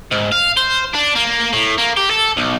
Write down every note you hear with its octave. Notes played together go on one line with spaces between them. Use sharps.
G#2
F5
C5
D4
A#3
A2
A#3
G4
A4
B1